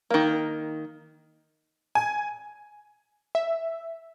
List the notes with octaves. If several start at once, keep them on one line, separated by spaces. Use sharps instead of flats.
D#3 A#3
G#5
E5